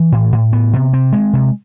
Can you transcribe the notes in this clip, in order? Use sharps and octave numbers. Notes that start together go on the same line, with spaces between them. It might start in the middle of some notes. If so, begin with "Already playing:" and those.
Already playing: E3
A2
A2
B3
C3
C4
G#3
C3